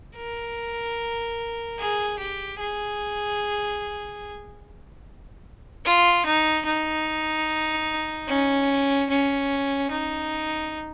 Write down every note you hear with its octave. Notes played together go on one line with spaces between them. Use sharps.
A#4
G#4
G4
G#4
F4
D#4
D#4
C#4
C#4
D#4